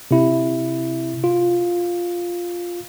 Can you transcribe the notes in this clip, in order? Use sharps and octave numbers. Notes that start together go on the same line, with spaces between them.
C3 E4
F4